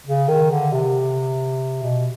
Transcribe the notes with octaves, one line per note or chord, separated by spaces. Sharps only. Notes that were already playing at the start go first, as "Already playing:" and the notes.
C#3
D#3
D3
C3
B2